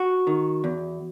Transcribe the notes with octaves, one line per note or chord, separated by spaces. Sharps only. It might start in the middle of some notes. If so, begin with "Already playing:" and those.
Already playing: F#4
D#3
E2